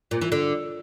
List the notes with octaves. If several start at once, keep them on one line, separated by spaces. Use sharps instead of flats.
A#2
E3
D3